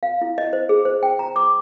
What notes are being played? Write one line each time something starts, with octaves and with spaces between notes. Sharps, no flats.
F5
E4
D#5
C5
G#4
C5
G5
A#5
D6